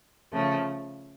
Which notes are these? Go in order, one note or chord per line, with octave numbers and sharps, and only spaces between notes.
C#3 F3 A3